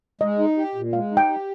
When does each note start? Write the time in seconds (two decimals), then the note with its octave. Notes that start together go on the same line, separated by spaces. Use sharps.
0.21 G#3 D#5
0.39 D#4
0.57 G4
0.75 A#2
0.93 G#3 F5
1.11 D#4
1.17 G5
1.29 G4